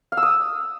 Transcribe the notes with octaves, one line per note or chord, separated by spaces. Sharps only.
F5
E6
D#6